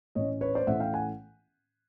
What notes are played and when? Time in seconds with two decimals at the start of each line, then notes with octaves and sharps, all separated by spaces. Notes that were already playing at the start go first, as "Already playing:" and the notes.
0.15 A2 E3 A3 C#4 C#5 D#5
0.41 B4 C#5
0.55 C5 D5
0.67 A2 E3 A3 C#4 E5 F#5
0.80 F5 G5
0.94 F#5 G#5